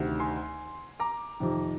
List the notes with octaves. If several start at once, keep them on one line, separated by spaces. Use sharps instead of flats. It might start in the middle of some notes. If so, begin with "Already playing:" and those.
Already playing: D2 C3 D#3
G#5 C6
A#5 D6
F2 C3 D#3